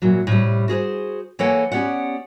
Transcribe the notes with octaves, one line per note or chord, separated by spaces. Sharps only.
A#2 E3 F#3
A2 C3 G3
F#4 G#4 A#4 C5
E3 A#3 A4 C#5 F#5 G#5
B3 C#4 G4 D5 F#5